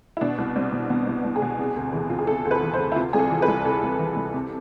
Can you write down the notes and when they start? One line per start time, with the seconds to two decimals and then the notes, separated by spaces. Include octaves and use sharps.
0.17 E4
0.21 B2 D4
0.38 C2
0.56 C2 C4
0.72 B2
0.90 B2 B3
1.07 C2
1.24 C2
1.36 G#4
1.42 B2
1.59 C3
1.76 D2
1.93 E3
2.10 D2 F4
2.19 G#4
2.27 C3 A4
2.45 D2
2.51 B4
2.62 E3
2.74 C5
2.79 D2
2.92 E4
2.96 C3 F4
3.13 C2 G#4
3.19 A4
3.30 E3
3.42 B4
3.48 C2
3.65 C3 A4
3.82 C2
3.99 E3
4.16 C2
4.34 C3